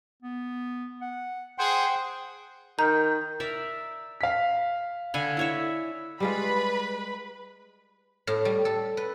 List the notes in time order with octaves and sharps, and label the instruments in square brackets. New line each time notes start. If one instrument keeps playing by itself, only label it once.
[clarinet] B3
F#5
[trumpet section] G#4 C5 [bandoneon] F#5 G5 [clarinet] C6
[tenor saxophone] D#3 [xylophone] A#5 [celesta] G6
[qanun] A#4 D5 E5
[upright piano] F5 B6
[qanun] D3 G#5 B5
E4 C#5 E5
[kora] G3 G#3 F4 [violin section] B4 B5
[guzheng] A2
G3
A4
B4